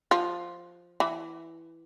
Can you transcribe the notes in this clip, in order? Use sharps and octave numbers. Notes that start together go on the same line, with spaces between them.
F3 F4
E3 E4